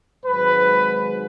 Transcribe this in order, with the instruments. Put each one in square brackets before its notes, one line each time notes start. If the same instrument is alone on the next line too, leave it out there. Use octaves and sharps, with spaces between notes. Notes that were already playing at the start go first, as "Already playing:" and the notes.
[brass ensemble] G#1 G#2 F#3 B4